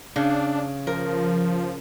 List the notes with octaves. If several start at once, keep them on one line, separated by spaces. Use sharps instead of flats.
C#3 D4
F3 A#4